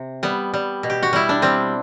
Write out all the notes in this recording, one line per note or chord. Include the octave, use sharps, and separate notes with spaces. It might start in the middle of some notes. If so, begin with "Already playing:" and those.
Already playing: C3
G3 B3
G3
B2
G4
F#4
G3 E4
D4
G3 C4